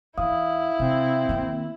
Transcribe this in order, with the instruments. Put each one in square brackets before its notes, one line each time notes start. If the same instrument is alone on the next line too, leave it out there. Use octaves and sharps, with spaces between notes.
[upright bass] E2 [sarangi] E4 [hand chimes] F5 D#6
[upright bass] C3 [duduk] C4
[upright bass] D#3 A#3